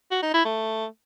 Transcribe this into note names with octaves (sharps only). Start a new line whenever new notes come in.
F#4
D#4
E4
A3